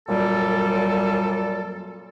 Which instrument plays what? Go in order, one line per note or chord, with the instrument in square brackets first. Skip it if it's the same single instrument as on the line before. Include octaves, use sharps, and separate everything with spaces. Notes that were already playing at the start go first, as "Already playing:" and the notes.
[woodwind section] F#2 A#2 F#3 G3 A4